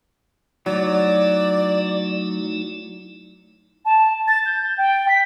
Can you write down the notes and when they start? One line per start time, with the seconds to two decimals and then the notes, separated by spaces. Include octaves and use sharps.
0.66 F#3 A3 D#4 E4 D5
3.85 A5
4.28 A6
4.46 G6
4.78 G5
5.09 B6